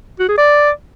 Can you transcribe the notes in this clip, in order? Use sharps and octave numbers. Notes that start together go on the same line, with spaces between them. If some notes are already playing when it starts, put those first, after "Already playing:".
F#4
G#4
D5